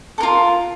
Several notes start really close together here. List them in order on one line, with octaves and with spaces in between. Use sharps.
A4 A#4 F4